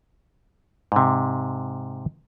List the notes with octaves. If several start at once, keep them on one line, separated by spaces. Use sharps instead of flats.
G#2 C3